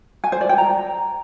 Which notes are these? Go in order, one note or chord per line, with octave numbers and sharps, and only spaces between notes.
G#5
C5
D5
G5
A#5